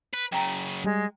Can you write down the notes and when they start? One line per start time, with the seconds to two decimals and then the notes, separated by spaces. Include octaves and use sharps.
0.14 B4
0.32 F#2 C#3 G5 A#5
0.84 G3 G#3